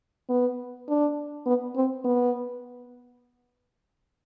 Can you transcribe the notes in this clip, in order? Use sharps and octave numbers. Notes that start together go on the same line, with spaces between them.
B3
D4
B3
C4
B3